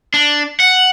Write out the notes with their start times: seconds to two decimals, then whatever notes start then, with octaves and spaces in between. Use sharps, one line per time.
0.14 D4
0.60 F#5